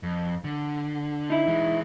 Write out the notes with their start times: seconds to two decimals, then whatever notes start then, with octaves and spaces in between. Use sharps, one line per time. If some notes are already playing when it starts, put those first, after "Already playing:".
0.03 F2
0.44 D3
1.30 D#4 E4
1.47 E3 G#3